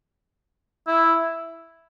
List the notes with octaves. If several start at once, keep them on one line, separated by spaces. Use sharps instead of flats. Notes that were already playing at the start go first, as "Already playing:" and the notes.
E4